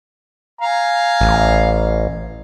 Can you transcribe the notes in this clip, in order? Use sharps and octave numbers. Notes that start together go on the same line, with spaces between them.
F5 G#5 A#5
A1